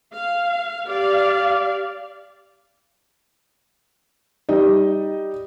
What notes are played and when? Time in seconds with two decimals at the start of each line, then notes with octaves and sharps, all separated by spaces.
0.11 F5
0.86 G4 D5 F5
4.49 G3 D#4 D#5